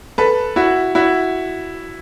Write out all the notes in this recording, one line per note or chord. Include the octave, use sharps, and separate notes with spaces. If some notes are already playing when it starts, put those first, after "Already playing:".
A4 B4
E4 F#4
E4 F#4